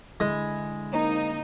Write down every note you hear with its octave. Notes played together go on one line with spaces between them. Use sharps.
D3 G#3 E4
A#3 C4 D#4